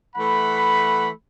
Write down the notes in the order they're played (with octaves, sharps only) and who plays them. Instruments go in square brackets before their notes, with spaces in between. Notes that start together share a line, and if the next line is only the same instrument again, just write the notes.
[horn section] E3 A3 F#5 B5